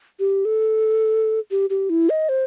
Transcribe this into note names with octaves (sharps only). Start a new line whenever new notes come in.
G4
A4
G4
G4
E4
D#5
C5